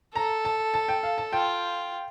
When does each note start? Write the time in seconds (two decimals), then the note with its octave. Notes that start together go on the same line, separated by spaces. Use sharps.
0.15 A4 A#5
0.45 A5
0.74 A5
0.89 G5
1.03 F5
1.18 A5
1.32 F4 G5